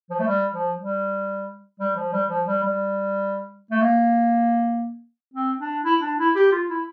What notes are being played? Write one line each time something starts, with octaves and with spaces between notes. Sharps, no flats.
F3
A3
G3
F3
G3
G3
F3
G3
F3
G3
G3
A3
A#3
C4
D4
E4
D4
E4
G4
F4
E4